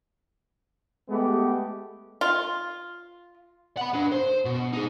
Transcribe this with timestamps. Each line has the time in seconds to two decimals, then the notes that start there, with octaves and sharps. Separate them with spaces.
1.08 G#3 A3 B3 G4
2.21 F4
3.77 F#5 B5
3.94 D4 B4
4.12 C5
4.45 B2
4.73 D#4 G#4